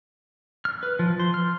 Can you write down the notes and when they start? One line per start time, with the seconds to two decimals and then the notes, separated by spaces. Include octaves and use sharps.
0.65 F6
0.83 B4
0.99 F3
1.20 C5
1.34 F6